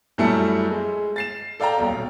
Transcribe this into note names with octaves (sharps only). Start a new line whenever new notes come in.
F#2 G3 A3 E4 A5 C#7
G#3
A6 C7 E7
A4 D5 F5 G5 A#5
D#1 B1